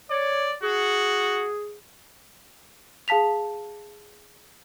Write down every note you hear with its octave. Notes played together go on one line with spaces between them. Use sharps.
C#5 D5
F#4 G#4
G#4 F5 A5 B6 F7